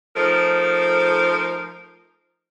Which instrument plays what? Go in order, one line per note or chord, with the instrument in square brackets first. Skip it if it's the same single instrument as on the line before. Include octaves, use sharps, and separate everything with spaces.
[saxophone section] F3 A3 D#4 A#4 C5